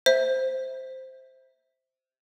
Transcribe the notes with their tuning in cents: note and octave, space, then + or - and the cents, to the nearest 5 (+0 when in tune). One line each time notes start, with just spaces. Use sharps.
C5 +0 E5 -20